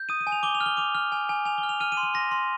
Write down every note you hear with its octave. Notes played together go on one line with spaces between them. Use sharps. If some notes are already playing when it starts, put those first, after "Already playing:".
Already playing: G6
D#6 D#7
D#7
G#5
F7
D6 G7
F7
F6
G7
D6 F7
F6
G#5
G#5
G#5 F7
G7
F6
F7
F6 D#7
D#7
C6
D#7
C6 A#6
C6